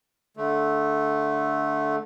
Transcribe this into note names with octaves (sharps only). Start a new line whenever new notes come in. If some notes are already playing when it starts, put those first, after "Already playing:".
D3 A3